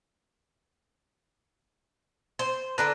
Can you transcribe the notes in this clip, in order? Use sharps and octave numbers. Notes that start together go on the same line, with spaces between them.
C5
D3 D4 B4 A#5 F#6 A#6